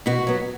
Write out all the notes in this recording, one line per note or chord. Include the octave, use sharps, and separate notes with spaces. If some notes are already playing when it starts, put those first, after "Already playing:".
B2 F#4
F#3 B3